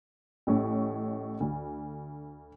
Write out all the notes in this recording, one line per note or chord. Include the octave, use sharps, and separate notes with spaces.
A1 A2 C#4
D2